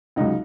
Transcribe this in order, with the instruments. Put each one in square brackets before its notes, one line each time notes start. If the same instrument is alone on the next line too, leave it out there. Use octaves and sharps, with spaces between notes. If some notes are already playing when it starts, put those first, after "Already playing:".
[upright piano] C#2 C#3 F#3 D#4